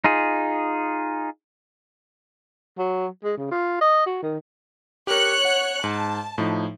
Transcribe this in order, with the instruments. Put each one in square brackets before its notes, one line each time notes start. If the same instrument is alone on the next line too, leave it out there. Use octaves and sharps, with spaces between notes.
[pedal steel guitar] D#4 F4 G#4
[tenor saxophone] F#3
G#3
C#3
F4
D#5
F#4
D#3
[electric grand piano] G4 A#4 [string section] C#5 F#6 C#7
[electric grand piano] F#5
[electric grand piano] G#2 [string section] A5
[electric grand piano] A2 F3 D#4